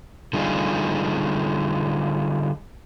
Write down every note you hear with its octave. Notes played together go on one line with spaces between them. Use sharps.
D3 G3 D#4 F4 G#4